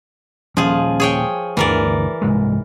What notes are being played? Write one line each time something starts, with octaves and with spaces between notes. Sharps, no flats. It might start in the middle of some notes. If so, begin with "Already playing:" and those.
D#1 F3 G3 C#4 G#4
G#4 C#5 G5
G1 D2 E3 A#4 D5
C2 G#2 G#3